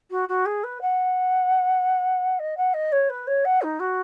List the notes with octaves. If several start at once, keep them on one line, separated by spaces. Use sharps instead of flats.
F#4
F#4
G#4
B4
F#5
D#5
F#5
D#5
C#5
B4
C#5
F#5
D#4
F#4